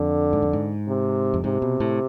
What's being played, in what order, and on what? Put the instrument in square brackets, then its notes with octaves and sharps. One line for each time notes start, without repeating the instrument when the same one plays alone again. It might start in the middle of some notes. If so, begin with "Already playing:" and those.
Already playing: [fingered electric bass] F2 [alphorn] D3
[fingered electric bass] G#2
F2
G#2
[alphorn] C3
[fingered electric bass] F2
[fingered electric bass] G#2 [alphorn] C3
[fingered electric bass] B2
A2